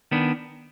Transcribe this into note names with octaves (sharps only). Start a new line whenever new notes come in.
D#3 B3 D4